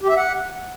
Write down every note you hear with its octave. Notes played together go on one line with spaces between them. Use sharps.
G4
E5
F#5